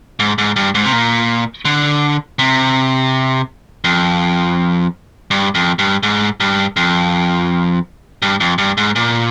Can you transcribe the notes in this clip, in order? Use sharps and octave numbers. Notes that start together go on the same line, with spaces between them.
G#2
G#2
G2
G#2
C3
A#2
D3
C3
F2
G2
F2
G2
G#2
G2
F2
G2
F2
G2
G#2
A#2